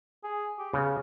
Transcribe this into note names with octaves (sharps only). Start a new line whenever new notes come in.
G#4
G4
C#3 B3